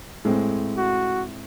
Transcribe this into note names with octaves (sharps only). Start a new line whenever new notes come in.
A2 G#3 C4
F#4